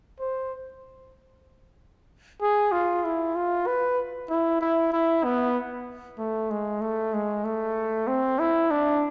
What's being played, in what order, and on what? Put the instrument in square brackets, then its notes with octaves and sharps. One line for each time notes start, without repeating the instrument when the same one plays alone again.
[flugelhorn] C5
G#4
F4
E4
F4
B4
E4
E4
E4
B3
A3
G#3
A3
G#3
A3
C4
E4
D4